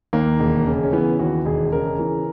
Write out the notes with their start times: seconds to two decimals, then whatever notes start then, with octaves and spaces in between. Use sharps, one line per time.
0.13 D#2 A#3
0.40 E1
0.66 C#3
0.83 C#4
0.93 E3 B3
1.19 D#2 F#4
1.45 E1 G#4
1.72 C#3 A#4
1.99 E3